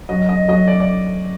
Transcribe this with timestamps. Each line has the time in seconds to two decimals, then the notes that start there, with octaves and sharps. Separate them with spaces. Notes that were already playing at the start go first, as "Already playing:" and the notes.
0.09 F#3 D#5
0.29 D#5
0.48 F#3 D#5
0.68 D5
0.80 D5